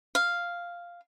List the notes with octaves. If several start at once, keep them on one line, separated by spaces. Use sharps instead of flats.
F5